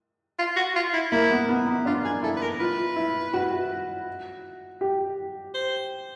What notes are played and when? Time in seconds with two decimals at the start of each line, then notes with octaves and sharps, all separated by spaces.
0.39 F4
0.56 F#4
0.76 F4
0.94 E4
1.12 A#3 E4
1.31 B3
1.49 B3
1.67 B3
1.86 D4 F4
2.05 G#4
2.23 E4 A4
2.37 B4
2.41 A#4
2.60 F4 B4
2.96 E4
3.34 F#4
4.81 G4
5.54 C5